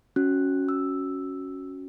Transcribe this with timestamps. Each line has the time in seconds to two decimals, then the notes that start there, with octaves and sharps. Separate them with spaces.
0.16 C#4 F#4 F#6
0.69 E6